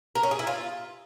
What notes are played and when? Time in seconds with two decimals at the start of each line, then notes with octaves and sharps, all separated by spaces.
0.15 A#4
0.23 C#4
0.31 G#4
0.39 E4
0.47 F4